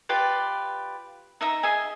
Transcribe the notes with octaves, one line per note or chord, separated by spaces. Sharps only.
F4 G4 B4 D5
D#4 E5 A#5
G#4 D#5 E5 G#5